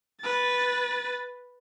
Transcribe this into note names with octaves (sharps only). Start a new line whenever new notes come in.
B4 A6